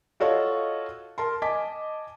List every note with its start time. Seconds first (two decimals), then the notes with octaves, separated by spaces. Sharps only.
0.20 F4 F#4 A4 C#5 D#5 F5
1.18 A#4 A5 C6
1.42 D#5 G#5 A5 D6 B6